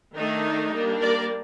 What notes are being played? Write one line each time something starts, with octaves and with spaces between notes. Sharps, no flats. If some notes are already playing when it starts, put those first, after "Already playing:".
D#3 A3 D4 D#4
G3 A#3 D4
A#4 D5